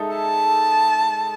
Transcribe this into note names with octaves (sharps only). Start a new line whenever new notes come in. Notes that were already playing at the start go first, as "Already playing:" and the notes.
Already playing: G#3 D#4 A4 E5
A5